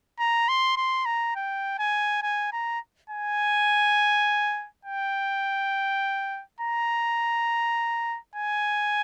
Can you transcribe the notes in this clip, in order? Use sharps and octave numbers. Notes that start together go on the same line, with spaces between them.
A#5
C6
C6
A#5
G5
G#5
G#5
A#5
G#5
G5
A#5
G#5